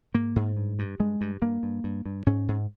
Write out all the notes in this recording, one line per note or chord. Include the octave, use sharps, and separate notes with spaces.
G#2 A#3
G#2
G2
G2
G2 G#3
G2
G2 A#3
G2
G2
G2
G#2 C#4
G#2